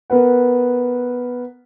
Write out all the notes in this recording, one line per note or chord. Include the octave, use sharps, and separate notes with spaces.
B3 A#4 B4 F#5